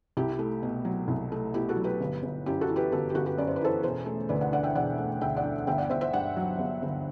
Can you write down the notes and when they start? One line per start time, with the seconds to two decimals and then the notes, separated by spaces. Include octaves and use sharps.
0.17 C2 E4 G4
0.32 E4
0.39 A3
0.63 B2
0.85 F#3
1.08 C2
1.32 A3
1.54 B2 E4 G4
1.69 F#4 A4
1.76 F#3
1.84 G4 B4
2.01 G1
2.23 G1
2.46 F#2 E4 G4
2.61 F#4 A4
2.68 E3
2.76 G4 B4
2.92 G1 F#4 A4
3.10 G4
3.14 G1 F#4 A4
3.26 G4 B4
3.38 F#2 D5
3.47 C5
3.56 B4
3.61 E3 A4 C5
3.83 E1 A4 C5
4.06 A3
4.29 D2 B4 D5
4.41 D5 F#5
4.52 D3 D5 F#5
4.63 E5 G5
4.75 E1 D5 F#5
4.98 A3
5.21 D2 E5 G5
5.36 D5 F#5
5.44 D3
5.67 G1 E5 G5
5.78 D5 F#5
5.89 G1 C5 E5
6.01 C5 E5
6.13 G2 D5 F#5
6.37 F#3
6.59 G1
6.82 G1